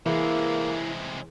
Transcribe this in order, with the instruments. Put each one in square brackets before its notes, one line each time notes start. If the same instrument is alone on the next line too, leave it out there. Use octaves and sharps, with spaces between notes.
[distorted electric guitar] C3 G#3 [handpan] E3 G#4 [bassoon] A#3 [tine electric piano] E4